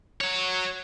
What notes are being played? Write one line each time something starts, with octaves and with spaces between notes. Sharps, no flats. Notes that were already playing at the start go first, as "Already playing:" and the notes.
F#3 C#5